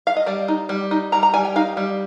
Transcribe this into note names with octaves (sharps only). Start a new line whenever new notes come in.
F5
D#5
G3 D5
D#4
G3
D#4
G3 A#5
A#5
G3 G#5
G5
D#4 F5
G3